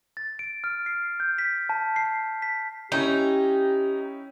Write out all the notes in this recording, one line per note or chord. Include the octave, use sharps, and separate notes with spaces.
A6
D7
F6
C7
G6
B6
A5
C7
B6
C#4 D#4 E4 G4